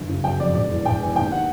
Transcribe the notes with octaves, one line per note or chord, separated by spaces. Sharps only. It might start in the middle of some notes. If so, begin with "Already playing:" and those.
Already playing: G1 F#2
C#3
F#3 G5
F2 D5
E1 D5
E2
E1 G5
E2 G#5
D#2 G5
D#3 F#5